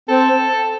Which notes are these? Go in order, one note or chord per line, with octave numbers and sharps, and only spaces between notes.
C4 A4